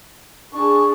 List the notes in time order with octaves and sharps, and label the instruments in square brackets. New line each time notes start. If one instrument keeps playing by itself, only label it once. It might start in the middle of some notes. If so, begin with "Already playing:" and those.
[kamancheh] D4 G#4 [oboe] C#6